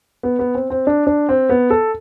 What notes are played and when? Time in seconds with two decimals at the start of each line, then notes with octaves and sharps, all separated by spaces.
0.23 B3
0.39 B3
0.55 C4
0.70 C4
0.87 D4
1.07 D4
1.29 C4
1.50 B3
1.70 A4